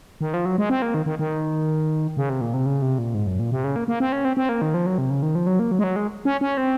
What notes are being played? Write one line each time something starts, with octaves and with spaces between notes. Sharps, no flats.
D#3
F3
F#3
G#3
C4
A#3
D#3
D#3
D#3
C#3
C3
A#2
C3
C#3
C3
A#2
G#2
F#2
A#2
C3
C#3
A#3
A#3
C4
C#4
C4
C4
A#3
D#3
F3
F#3
C3
C#3
D#3
F3
F#3
A#3
F#3
G#3
F#3
G#3
C#4
C#4
C4